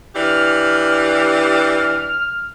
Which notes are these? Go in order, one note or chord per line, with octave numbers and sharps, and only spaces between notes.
E3 D4 G4 F6